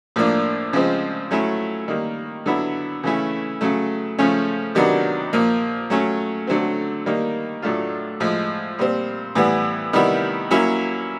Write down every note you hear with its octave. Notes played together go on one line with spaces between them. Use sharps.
A2 F3 A#3 D4
C#3 F3 G#3 C4
F#3 A3 C#4 E4
D#3 G3 A#3
D3 F#3 B3 E4
C#3 E3 A3 C#4 E4
C#3 F#3 A3
C#3 F3 A3 C#4
C3 D#3 F#3 B3 D4
A#2 F3 A#3
F#3 A3 C#4
D3 F#3 A3 C4
D#3 G3 A#3 D#4
A2 F#3 A3 D4 F4
A2 F3 G#3
A#2 G3 C4
A2 E3 G3 B3
C3 D#3 G3 B3 E4
F#3 A#3 C#4 E4